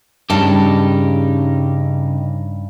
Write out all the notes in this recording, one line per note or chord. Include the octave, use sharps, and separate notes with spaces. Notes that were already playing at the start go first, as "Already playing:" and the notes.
G2 C#3 C#4 D#4 G4 A5